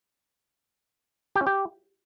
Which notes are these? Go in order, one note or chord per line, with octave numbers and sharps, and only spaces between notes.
G4
C#4
G4